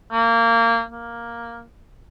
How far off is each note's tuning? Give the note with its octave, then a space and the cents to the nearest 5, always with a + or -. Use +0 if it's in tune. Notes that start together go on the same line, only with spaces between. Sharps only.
A#3 -20
A#3 +5